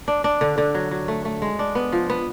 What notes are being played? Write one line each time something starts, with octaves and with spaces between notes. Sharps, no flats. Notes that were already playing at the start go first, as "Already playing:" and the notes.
D4
D4
D3
D3
F#3
F#3
A3
A3
G#3
D4
B3
F3
B3